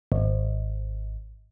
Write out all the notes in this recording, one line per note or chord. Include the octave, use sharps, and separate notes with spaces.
G#1